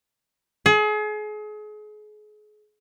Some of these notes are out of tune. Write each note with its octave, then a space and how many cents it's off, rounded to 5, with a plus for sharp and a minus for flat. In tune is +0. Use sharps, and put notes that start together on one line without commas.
G#4 +35